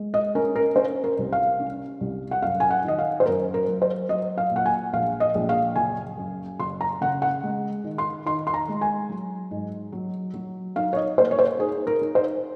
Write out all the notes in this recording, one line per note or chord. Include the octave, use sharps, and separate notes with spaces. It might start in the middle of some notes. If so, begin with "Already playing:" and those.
Already playing: G#3
D#5
C#4 A#4
A#4
C#4 C5
A#4
C2
F5
C#4
C2
F#5
F#2 F5
G#5
F#5
D#3 D#5
F5
C5
F#2 A#4
A#4
F#3
C5
F#3 D#5
F5
A#2 F#5
G#5
A#1 F5
D#5
A#1
F5
F#1 G#5
F#2
F#1 C6
A#5
C#3 F#5
F#5
G#3
D#3
C6
D#3 C6
C6
A#5
G#3
G#5
F#3
G#2
F#3
F#3
D#4 F5
C#5
D#5
A#3 C5
C#5
C5
D#4 G#4
A#4
D#4
C5